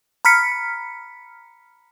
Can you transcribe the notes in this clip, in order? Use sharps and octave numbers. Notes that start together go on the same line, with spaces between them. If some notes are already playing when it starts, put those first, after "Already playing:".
A#5 B5 F6 B6 C#7